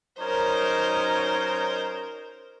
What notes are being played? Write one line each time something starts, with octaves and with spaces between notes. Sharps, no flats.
F#3 C#4 D#4 A#4 C5